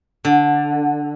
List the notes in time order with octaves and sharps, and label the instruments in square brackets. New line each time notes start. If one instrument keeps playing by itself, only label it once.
[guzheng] D3